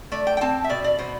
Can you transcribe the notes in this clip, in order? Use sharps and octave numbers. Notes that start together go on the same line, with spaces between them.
A3 D5
G5
G5
C4 A5
E5
B2 D5
D5
B2 C5